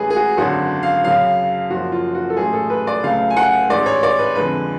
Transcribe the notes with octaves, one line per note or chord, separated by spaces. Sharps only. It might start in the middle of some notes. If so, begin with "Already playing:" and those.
Already playing: A1 A2 G#3 G#4 B4
G#4
F#4
G#1 F#2 D3 F#3 F#4
F5
F#2 C#3 F#3 F5
F#1 F#2 F3 F#4
F4
F#4
A4
A1 G#2 F#3 A3 G#4
A4
B4
D5
C#2 C#3 F#3 A3 F5
G#5
F#5
A1 G#2 G#3 D5
C#5
D5
B4
F2 D3 G#3 B4